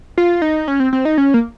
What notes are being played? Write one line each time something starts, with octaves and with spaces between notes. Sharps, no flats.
F4
D#4
C#4
C4
C4
D#4
C#4
A#3